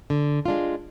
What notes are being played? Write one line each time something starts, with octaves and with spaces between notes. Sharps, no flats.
D3
G#3 D4 F4